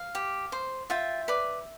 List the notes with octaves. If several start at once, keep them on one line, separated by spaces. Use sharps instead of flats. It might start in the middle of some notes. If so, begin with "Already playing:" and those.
Already playing: F5
G4
C5
F4 E5 G5
B4 D5